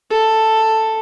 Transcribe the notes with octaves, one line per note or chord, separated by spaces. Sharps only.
A4